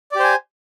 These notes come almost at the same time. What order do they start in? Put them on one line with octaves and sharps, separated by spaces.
D5 G4 C5 G#5